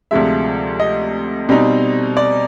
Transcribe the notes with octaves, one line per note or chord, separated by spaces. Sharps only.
D2 C3 F3 G#3 E5
D#5
B2 G3 C4 D#4
D5